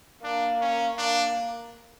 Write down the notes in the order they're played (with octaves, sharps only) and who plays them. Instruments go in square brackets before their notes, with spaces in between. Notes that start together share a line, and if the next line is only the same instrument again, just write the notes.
[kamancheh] A#3 [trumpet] D4
[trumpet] C#4
[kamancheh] A#3 [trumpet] D4